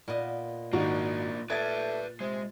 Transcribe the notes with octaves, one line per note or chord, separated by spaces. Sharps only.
A#2 B3 D#5
G#1 A#3 D4 D#4 F#4
A3 B4 D5 G#6 A6
C3 G#3